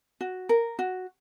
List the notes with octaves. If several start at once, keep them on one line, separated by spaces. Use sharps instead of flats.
F#4
A#4
F#4